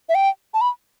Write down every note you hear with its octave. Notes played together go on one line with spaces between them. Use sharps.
E5
G5
A5
B5